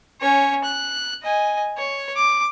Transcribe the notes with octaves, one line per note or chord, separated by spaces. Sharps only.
C#4 C#5
F#6
D#5 G#5
C#5
D6